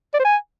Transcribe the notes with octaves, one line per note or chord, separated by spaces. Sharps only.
D5
C5
G#5